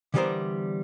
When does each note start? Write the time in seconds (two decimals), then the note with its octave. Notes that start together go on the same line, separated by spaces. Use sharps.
0.14 D3 E3 G3 B3 A#4 C5